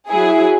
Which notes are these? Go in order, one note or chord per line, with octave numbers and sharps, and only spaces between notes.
F#3 E4 G#4